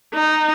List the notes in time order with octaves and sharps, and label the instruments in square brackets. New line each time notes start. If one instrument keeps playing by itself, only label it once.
[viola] D#4